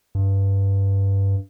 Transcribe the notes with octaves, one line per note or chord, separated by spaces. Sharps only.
G2